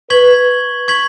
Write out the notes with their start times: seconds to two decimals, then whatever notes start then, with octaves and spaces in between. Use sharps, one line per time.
0.10 B4 C#6 G#6 B6 F#7
0.88 C#6 G#6 B6 F#7